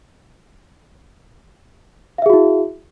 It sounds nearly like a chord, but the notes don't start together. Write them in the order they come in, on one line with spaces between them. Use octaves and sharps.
F5 E5 G#4 F#4 E4